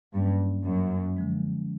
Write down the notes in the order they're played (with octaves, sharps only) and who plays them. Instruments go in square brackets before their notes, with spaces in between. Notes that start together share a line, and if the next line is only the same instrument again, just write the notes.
[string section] G2 [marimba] F#3 A#3 C#4
[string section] F#2 [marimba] F#3 A#3 C#4
[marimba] D3 F3 G#3